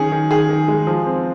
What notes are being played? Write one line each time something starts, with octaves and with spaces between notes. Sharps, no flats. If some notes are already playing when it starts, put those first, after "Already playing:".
Already playing: D#3 C#4 G#4
D#3
D#3 G#4
D#3
G#3
F3
C4